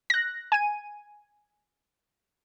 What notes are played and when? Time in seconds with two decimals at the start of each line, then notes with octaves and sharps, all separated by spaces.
0.10 F#6 A#6
0.52 G#5 D#7